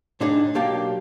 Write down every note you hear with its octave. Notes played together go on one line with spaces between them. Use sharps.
A2 D4 D#4 G#4
B1 A#3 G4 F5 A5